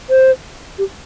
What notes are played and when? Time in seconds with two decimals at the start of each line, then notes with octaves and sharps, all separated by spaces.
0.10 C5
0.78 G4